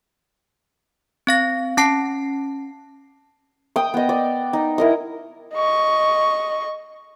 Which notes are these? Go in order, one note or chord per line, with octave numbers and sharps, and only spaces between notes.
C4 F5 A#6
C#4 A5 C7
G5 D#6
B3 D#5
D5
D#4
E4 A#4 D#5
D#5 C#6